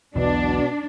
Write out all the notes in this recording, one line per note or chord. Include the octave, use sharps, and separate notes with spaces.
B1 E2 B2 F#3 D4